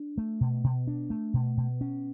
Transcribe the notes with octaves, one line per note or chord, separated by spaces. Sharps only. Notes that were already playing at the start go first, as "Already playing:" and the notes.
Already playing: D4
A3
B2
B2
D4
A3
B2
B2
C#4